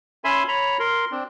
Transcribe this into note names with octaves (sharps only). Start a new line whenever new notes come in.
C#4 E5 G#5 B5 C6
C#5 A#5 B5
A#4 C6
C4 D4